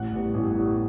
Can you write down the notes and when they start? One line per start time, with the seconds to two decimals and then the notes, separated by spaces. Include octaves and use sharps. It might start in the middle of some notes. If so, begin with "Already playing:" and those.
Already playing: A1 F#5
0.12 A2 G3 B3
0.34 A1
0.56 A2 G3 B3